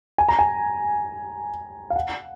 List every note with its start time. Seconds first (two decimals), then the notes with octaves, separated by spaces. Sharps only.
0.18 G#5
0.29 A#5
0.39 G#5
1.90 F5
1.96 F#5